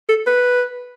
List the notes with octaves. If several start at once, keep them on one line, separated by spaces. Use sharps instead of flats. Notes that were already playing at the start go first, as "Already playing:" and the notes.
A4
B4